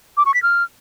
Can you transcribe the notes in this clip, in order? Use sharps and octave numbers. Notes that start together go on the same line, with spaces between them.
D6
C#6
B6
F6